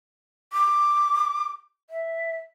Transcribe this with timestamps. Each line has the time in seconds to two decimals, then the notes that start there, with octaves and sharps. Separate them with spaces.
0.53 D6
1.90 E5